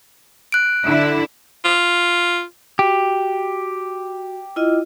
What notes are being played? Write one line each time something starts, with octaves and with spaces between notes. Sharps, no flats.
F#6 D7
D3 E4
F4
F#4 G4
E4 F4 D#5